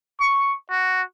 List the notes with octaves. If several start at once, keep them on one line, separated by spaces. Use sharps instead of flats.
C#6
F#4